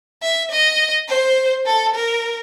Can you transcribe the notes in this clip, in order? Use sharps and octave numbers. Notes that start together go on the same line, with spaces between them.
E5
D#5
C5
A4
A#4